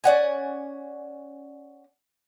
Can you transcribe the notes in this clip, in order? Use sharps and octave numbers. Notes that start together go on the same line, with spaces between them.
C#4 D5 F#5 G#5